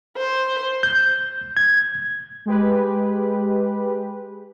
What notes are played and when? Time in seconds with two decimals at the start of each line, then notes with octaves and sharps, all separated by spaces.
0.18 C5
0.83 G6
1.57 G#6
2.46 G#3 G4 B4